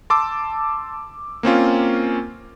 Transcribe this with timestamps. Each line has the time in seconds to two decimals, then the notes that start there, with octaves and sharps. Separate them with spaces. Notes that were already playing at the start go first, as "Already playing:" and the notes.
0.10 A5 C6 D6 E6
1.43 A#3 C4 C#4 F4